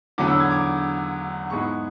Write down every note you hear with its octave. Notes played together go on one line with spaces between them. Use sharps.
E2 D3 F#3 B3 D6
E6
G#6
D6
G#2 G#3 B3 E4 C#6